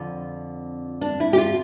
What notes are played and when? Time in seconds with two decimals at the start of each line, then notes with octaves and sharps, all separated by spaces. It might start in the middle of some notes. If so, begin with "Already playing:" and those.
Already playing: F2 D3 C4 F4
1.01 D4
1.20 E4
1.33 G4
1.38 F4